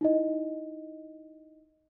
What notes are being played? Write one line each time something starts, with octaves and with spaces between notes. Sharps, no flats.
D#4 E4 D#5